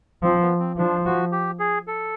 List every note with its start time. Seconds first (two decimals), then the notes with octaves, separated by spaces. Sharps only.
0.23 F3 C4
0.41 B3
0.60 C4
0.77 F3 D4
1.06 F#4
1.32 G4
1.59 G#4
1.87 A4